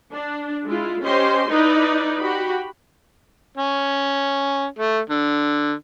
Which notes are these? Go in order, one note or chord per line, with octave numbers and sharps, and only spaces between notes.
D4
G#3 E4 F4
C#4 G4 C5 D#5 C6
D#4 E4 B4 D5
F#4 G4 B5
C#4
A3
D3